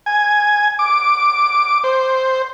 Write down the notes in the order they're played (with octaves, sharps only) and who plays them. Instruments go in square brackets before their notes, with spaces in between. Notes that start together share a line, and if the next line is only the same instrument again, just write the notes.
[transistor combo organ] G#5
D6
C5